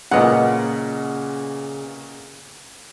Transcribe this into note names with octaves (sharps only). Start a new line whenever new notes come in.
A#2 C#3 B3 D#5 F#5